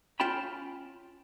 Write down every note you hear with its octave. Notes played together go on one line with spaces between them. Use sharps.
C#4 F4 G5 A5 B5